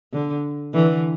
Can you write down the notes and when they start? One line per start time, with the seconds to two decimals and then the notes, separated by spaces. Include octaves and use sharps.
0.13 D3
0.74 D3 E3